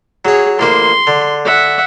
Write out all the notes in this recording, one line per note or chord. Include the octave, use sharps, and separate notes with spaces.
F#3 G#4 C#5
A1 A#3 C5 C6
D3
E5 F#5